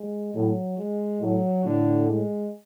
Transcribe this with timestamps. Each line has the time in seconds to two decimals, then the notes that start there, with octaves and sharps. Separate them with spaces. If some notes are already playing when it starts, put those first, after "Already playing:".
Already playing: G#3
0.35 A2 F#3
0.78 G#3
1.21 A2 F#3
1.65 A2 D3
2.08 G#3